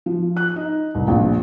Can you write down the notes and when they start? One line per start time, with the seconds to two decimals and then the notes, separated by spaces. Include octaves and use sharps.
0.06 F3
0.37 F#6
0.56 D#4
0.95 C2
1.08 A#1